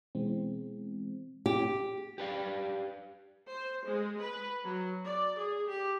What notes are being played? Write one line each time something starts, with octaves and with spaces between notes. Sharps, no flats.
B2 E3 G#3 C4
G4
G4 B4 D5 F5
C5
G#3
B4
F#3
D5
G#4
G4